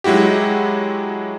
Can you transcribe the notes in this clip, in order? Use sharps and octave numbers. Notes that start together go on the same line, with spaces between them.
F#3 G#3 E4 F#4 G4